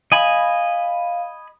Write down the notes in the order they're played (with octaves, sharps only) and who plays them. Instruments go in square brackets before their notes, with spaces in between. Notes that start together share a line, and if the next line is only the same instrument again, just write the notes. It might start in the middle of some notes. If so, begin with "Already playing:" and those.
[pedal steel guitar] D#5 G#5 B5 [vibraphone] F5